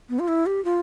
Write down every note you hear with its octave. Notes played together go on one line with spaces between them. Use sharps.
B3
F4
E4
G4
F4